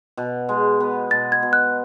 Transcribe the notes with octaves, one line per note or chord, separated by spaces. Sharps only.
B2
G#3
B3
B2 A6
G#6
B2
F#6